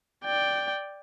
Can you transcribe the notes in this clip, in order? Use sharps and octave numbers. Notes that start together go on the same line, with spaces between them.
D5 G5